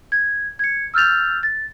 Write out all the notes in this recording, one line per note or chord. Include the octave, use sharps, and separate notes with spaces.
G#6
G#6 C#7
E6 F6 G6 A6 F7
A6